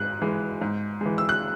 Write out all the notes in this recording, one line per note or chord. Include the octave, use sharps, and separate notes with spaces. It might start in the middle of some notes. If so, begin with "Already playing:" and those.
Already playing: G#2 G#3 F#6
E3 G#3
G#2
E3 G#3
E6
F#6